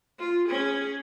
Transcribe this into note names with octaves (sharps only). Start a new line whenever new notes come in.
F4
C#4 G#4